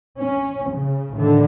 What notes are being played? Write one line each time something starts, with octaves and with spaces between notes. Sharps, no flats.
C#4
C#3
A1 A2 D3 D#3